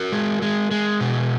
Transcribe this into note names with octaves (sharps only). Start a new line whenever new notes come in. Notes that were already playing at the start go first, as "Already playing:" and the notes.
Already playing: F#4 A#4
G#3
G#3
G#3
B2